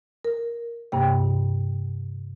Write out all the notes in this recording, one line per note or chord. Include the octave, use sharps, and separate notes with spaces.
A#4
G2 C3 A#3 G5